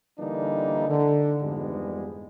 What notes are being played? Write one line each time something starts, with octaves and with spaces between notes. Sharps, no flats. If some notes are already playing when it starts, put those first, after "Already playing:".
D3 E3 G3 A#3 D4 D#4
D3
F2 G#2 E3 G3 G#3 B3